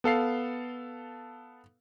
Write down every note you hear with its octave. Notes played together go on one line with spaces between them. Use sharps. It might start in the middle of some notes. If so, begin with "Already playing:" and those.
B3 A4 F5 C7